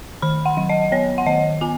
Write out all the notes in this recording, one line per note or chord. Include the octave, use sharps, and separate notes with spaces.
D#3 B5
F#5
F#3
D#5
B3 C#5
F#5
D#3 D#5
B3 G#5